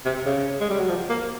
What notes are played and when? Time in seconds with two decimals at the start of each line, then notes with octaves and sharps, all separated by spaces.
0.05 C3
0.26 C#3
0.61 G#3
0.70 G3
0.79 F#3
0.89 F3
1.09 A#3